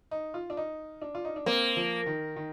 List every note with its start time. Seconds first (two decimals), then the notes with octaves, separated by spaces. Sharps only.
0.11 D#4
0.34 F4
0.50 D4
0.57 D#4
1.02 D4
1.15 F4
1.25 D#4
1.36 D4
1.46 A#3 C4
1.76 F3
2.06 D#3
2.36 D#3